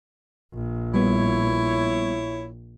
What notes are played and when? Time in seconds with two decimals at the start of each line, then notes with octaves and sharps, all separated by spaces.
0.54 A#1
0.94 G3 B3 E4 C#5